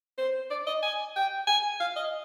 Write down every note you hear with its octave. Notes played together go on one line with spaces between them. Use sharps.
C5
D5
D#5
G#5
G5
G#5
F5
D#5